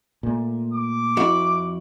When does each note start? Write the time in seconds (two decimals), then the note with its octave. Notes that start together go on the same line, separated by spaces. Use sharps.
0.23 A#2 A3
0.73 D6
1.17 F2 E4 F#4